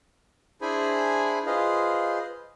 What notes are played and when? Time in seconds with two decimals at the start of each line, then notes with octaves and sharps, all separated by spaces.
0.61 D4 E4 G#4 C5 G#5 B5
1.46 F4 G#4 B4 C5 D#5 F5